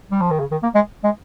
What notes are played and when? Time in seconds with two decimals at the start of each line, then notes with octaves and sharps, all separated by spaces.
0.12 G3
0.21 F3
0.31 D#3
0.40 C#3
0.52 D#3
0.63 A#3
0.75 G#3
1.04 G#3